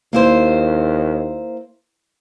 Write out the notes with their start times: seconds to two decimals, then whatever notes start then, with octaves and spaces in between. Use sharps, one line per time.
0.13 D#2 A#3 E4 C5